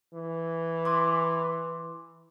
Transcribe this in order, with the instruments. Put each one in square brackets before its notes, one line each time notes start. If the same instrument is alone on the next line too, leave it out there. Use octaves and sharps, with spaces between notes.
[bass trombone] E3
[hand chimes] C6 D6